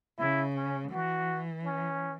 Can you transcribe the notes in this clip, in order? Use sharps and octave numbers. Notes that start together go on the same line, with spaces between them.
C#3 E4
C#4
E3 F#4
C#4